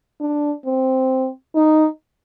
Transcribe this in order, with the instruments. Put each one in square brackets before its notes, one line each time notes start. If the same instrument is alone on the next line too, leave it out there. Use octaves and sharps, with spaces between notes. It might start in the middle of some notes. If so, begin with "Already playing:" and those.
[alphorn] D4
C4
D#4